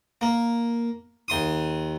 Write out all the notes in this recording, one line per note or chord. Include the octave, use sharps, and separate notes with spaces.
A#3
D#2 C6 D#6